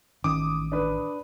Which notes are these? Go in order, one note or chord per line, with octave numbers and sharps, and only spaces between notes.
A1 D#3 C#4 D6 D#6
D4 B4